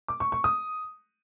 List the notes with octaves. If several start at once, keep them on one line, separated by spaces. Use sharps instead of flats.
D6
C#6
C#6
D#6